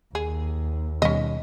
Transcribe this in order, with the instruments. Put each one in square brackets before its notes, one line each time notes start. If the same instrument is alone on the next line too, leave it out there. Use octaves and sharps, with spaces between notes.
[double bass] D#2 [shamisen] G#4
[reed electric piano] B2 D#3 G3 [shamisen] C#4 D#5